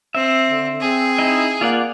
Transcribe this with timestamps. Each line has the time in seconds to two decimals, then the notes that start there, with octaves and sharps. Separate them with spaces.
0.15 C4 E5
0.46 D3
0.80 C4 G#4
1.18 D#4 E4 D#5
1.61 A#3 F4 D5 F#5